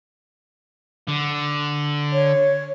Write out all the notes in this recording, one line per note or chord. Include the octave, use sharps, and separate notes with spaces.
D3
C#5